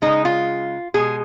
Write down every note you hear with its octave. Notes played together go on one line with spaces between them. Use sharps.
C#3 G#3 D#4
F4
B2 G#3 G#4